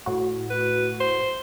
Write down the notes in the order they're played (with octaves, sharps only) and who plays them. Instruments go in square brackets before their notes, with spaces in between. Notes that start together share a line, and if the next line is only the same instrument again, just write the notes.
[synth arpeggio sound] A2 F#4
[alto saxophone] B4
C5